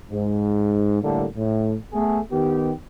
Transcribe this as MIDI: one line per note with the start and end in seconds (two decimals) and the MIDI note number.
0.10 1.00 44
1.02 1.25 45
1.02 1.25 50
1.02 1.25 55
1.02 1.25 57
1.02 1.25 58
1.02 1.25 69
1.36 1.74 45
1.93 2.19 57
1.93 2.19 59
1.93 2.19 68
2.31 2.71 51
2.31 2.71 59
2.31 2.71 67